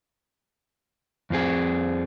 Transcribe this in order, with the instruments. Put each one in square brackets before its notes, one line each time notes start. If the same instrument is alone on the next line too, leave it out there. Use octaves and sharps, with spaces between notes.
[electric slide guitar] F2 F3 C4 G#4